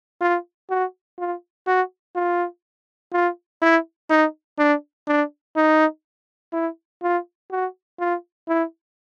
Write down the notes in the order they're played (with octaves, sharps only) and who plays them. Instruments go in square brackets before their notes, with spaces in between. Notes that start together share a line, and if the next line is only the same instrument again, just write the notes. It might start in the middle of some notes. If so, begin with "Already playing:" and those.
[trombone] F4
F#4
F4
F#4
F4
F4
E4
D#4
D4
D4
D#4
E4
F4
F#4
F4
E4